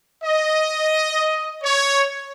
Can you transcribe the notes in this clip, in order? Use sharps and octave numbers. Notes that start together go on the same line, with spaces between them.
D#5
C#5